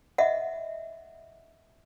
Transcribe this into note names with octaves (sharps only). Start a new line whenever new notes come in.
D#5 E5 F#5